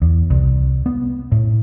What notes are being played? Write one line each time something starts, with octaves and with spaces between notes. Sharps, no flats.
E2
C2
B3
A2